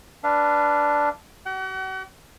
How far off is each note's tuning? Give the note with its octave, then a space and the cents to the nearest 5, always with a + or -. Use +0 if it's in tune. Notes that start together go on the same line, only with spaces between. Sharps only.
D4 +0 B4 +0 F5 -30
F#4 +45 F#5 +40